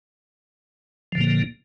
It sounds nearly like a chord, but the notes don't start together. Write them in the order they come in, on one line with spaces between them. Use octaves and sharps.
F3 D3 A#2 A#3